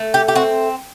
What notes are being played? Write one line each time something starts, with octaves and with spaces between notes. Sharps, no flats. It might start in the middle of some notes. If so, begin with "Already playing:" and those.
Already playing: A3
G4
G4
C4 F#4